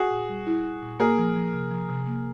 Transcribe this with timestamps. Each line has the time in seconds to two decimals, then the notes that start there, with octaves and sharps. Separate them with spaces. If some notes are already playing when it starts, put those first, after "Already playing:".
Already playing: F#4 G#4
0.11 A#2
0.29 G3
0.47 E4
0.64 E4
0.82 A#2
0.99 A#3 G#4 A#4
1.18 F3
1.36 F3
1.53 C3
1.71 F3
1.89 C3
2.07 A#3